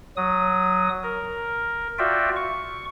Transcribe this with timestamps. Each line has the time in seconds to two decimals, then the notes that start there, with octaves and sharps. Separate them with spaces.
0.17 F#3 D#6
1.03 A#4
1.99 F4 F#4 D5 E5 G5
2.36 C#6